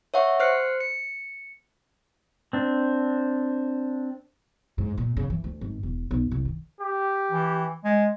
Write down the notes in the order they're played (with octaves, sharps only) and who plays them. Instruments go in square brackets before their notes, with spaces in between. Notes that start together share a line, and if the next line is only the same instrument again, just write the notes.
[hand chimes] C#5 E5 F#5 C#6
C5 F6 F#6 C7 C#7
C#7
[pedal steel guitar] C4 D4
[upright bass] G#2
A#2
C#3
E3
D2
G#1
E1
B1
C2
D#3
[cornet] G4
[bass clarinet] E3
G#3